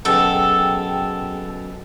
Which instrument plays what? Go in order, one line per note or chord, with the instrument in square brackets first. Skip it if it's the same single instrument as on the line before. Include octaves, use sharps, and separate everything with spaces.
[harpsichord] F#2 B2 [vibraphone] G#4 G5 [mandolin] A4